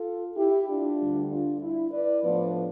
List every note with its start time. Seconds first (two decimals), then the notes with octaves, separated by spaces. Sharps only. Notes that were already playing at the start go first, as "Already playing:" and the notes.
Already playing: F4 A4
0.36 E4 G4
0.67 D4 F4
0.99 D2 D3 G3
1.29 D4 F4
1.61 E4
1.92 B4 D5
2.23 A2 F3 B3 D4 B4 D5